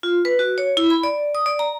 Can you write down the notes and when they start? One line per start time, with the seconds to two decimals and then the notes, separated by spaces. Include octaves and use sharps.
0.03 F4
0.25 B4
0.39 F#4
0.58 C#5
0.77 E4
0.90 B5
1.03 D5
1.35 D#6
1.46 D5
1.59 A#5